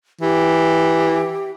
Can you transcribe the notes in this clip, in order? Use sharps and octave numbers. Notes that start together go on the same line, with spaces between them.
E3 G4